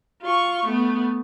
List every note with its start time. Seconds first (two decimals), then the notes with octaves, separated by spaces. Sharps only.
0.22 F4 C#6
0.66 A3 B3